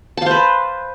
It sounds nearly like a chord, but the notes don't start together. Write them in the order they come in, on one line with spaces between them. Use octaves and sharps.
A5 F5 C5 B4